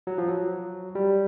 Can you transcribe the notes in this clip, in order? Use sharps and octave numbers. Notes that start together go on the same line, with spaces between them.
F#3
F3
F#3
G3